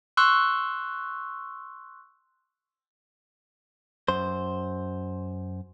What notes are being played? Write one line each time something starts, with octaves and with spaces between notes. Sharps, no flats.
C6 C#6 E6 F#6
F#2 C5